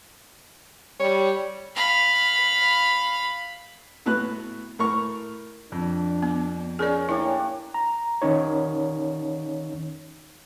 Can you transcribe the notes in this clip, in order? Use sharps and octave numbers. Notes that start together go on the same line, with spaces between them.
G3 C#5
F5 B5
A2 B3 F#4 F#6
A2 A#4 C#6
F2 D4
B3
C#4 G#4 A#4 C#5 D5
A3 A#3 D4 E4 G4 C#5
A#5
D#3 C#4 D#4 C#5